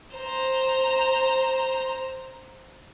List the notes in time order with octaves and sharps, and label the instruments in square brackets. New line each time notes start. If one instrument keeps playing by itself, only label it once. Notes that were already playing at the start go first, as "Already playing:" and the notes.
[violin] C5 A#5